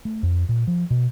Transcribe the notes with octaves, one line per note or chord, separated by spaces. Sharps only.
A3
F2
A#2
F3
B2